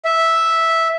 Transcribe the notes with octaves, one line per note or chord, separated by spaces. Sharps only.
E5